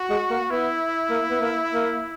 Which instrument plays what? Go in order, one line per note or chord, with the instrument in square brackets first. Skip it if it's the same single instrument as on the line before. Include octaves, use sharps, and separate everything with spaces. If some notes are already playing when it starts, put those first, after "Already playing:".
Already playing: [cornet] F#4
[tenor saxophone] G#3
A#3
[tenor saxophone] B3 [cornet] E4
[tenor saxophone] A#3
B3
A#3
A#3